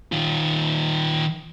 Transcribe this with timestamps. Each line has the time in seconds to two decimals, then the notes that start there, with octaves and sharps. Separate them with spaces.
0.12 D#3 F4